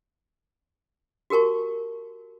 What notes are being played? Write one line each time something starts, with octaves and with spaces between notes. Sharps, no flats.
F#4 G4 A#4 A5 C#6